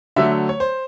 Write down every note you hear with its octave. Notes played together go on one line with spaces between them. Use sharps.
D3 F#3 A3 E5
C#5
C5